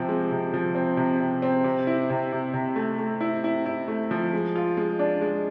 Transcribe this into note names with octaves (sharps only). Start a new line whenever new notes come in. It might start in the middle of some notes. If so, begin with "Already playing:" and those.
Already playing: C3 F3 C4
G#3
C3
F3
C4
C3
C3
C4
C3
E4
C3
C3
C3
A3
A3
E4
E4
E4
A3
F3
G#3
F4
G#3
D4
G#3